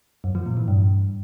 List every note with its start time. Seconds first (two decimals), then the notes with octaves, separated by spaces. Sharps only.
0.24 F#2
0.35 F3
0.46 A#2
0.57 E3
0.68 G2